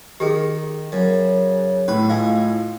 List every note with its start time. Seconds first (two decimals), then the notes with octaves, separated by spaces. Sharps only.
0.20 D#3 G4 G#4
0.92 F#2 C#3
1.88 A2 B4
2.10 G#3 F4 F5